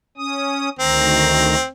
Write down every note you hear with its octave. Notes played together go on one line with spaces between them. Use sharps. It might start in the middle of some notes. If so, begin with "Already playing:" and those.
C#4 D#6
D2 D#3 C4 A#5